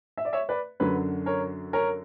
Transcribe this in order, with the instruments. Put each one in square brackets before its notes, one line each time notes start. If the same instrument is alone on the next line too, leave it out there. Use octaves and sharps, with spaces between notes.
[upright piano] E5
D5
C#5 E5
B4 D5
F#2 D3 F#3 B4
A#4 C#5
A#4 C#5